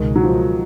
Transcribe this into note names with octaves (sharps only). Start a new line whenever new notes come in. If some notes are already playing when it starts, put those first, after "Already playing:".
Already playing: C#2 B2 D#3 G#3
F#3
F3